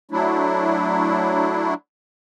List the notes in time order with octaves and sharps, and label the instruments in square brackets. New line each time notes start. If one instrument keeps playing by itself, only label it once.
[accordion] F#3 A3 D4 E4